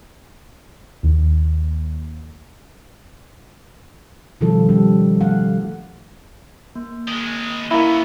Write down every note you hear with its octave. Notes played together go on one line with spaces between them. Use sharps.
D#2
B2 D#3 F3 G3 F4 A4
G3 C#4 D#4 G4
A3 F5 F#5
A#3
D#3 G#3
C#3 A#3 B3 E4 E5